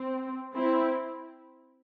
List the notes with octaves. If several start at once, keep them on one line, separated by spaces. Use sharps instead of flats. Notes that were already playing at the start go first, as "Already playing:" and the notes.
Already playing: C4
C4 E4